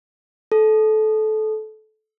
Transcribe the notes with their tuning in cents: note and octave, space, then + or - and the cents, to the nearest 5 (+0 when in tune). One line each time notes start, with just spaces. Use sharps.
A4 -20